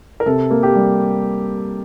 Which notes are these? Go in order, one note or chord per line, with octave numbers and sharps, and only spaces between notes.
A#4
C3 A4
A#3
G4
G3